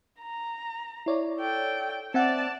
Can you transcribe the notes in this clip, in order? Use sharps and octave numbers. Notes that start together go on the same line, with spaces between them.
A#5
E4 C#5 D5
A4 G5
C4 D5 E5 F#5 A5